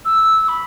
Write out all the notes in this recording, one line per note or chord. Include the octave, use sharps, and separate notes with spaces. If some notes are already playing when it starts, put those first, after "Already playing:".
E6
B5